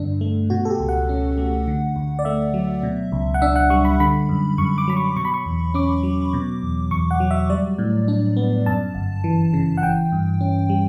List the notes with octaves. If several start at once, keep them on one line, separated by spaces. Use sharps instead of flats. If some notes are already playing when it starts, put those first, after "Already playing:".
Already playing: G2 D3 D4
A3
B2 F#4
A4
G4
C#2
F#5
C#4
A3
D3
D2
D5
A3 E5
F#3
B2
C#2
F#5
D4 E5
F#5
G3 C#6
B5
D3 B5
F#2
F#2 C#6
D6
F#3 B5
C#6
B2 C#6
B5
C#6
E2
C#4 D6
F#3
B2
E2
E2 C#6
F#5
F#3
E5
G3 D5
A2
D4
B3
F#2 A5
G1
E3
C#3
F#5
E3 G5
G2
C#4
G3